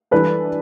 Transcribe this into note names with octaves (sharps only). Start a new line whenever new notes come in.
E3 G3 D4 A4 B4